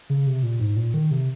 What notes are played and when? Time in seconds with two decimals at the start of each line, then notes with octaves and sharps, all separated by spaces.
0.10 C#3
0.27 C3
0.43 A#2
0.60 G#2
0.76 A#2
0.94 D#3
1.11 C3